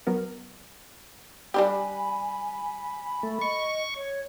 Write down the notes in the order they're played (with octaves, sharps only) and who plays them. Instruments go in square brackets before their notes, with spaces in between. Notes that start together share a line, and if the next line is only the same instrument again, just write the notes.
[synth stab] F#3 B3 A#4
[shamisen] G3 D4 G4 [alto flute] G#5 [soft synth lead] B5
[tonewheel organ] A3
[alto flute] D#5 [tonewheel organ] C#6
[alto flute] C#5